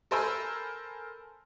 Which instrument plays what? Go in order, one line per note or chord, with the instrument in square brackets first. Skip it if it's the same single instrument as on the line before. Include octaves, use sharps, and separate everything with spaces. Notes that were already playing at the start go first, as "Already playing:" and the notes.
[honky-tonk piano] A4 A#4 C5 G#5 B5 E6